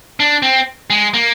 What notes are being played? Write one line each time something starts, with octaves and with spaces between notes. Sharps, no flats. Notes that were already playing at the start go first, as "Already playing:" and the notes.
D4
C4
G#3
A#3